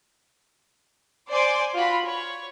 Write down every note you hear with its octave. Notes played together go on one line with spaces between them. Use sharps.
C5 D5 G#5 C6 D6
F4 F#4 B5
C#5